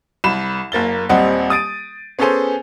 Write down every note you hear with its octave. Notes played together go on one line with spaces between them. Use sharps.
C2 B5 E7
F#1 A#3 A6 G7
D#1 G3 C4 D#5 F#5
D#6 A6 D7 D#7
B3 C#4 G#4 A4 C5 G#5